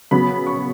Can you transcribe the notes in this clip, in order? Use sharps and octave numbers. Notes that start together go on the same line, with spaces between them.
C#3 F#3 B3 B5
C#6